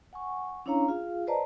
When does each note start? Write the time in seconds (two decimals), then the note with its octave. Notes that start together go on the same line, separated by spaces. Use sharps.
0.13 F#5 G#5 C#6
0.66 C#4 D4 E4 C#5 F5 A#5
0.88 F4 G#4 F5
1.27 B4 C5 D5 D#5 A5 A#5